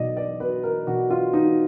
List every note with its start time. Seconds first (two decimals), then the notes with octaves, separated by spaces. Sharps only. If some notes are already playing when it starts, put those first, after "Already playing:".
Already playing: B1 B2 D5 D#5
0.17 D5
0.40 B2 B4
0.63 A#4
0.87 B1 F#4
1.10 F4
1.33 B2 D#4